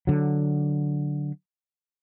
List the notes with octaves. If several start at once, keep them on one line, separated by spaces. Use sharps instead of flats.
D3 F#3